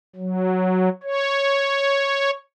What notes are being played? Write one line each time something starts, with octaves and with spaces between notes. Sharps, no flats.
F#3
C#5